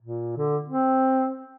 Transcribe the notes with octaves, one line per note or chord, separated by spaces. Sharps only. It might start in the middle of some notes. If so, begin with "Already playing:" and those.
A#2
D3
C4